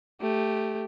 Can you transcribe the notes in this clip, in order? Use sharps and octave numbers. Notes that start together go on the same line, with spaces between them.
A3 G4